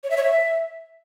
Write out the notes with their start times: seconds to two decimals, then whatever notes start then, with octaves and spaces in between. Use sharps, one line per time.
0.04 C#5
0.10 E5
0.17 C#5
0.24 E5